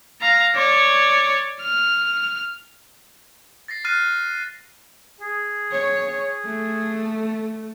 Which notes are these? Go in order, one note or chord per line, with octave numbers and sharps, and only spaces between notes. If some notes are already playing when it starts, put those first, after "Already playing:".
F5 A#5
C#5 D5
F6
A6 A#6 C7
F6 F#6 A6 C7 D#7
G#4
C#5
A3